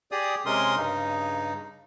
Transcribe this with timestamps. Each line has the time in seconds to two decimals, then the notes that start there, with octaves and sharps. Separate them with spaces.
0.12 G4 G#4 D5 D#6
0.46 C3 G#3 C#4 A#4 C6 D#6
0.76 G2 C#3 D#4